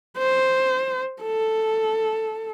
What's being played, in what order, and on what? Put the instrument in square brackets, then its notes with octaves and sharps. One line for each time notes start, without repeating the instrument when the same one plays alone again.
[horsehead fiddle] C5
A4